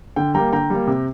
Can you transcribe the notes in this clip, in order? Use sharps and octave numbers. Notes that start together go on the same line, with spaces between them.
D3 G5
G3 A#3 G5 A#5
D3 G5 A#5
G3 A#3
C3